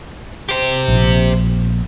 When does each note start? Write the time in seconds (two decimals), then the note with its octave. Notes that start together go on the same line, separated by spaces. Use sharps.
0.49 G4 C5
0.88 A#1